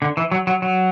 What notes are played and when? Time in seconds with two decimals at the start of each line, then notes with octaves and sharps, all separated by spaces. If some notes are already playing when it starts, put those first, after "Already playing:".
0.02 D3
0.17 E3
0.32 F#3
0.47 F#3
0.62 F#3